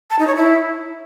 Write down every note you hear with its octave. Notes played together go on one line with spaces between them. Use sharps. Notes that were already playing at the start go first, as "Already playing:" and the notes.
A5
D#4
C#5
E4